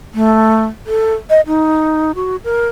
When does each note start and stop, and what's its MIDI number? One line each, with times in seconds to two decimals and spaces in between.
0.14 0.65 57
0.87 1.14 69
1.30 1.41 75
1.47 2.12 63
2.15 2.36 66
2.44 2.69 70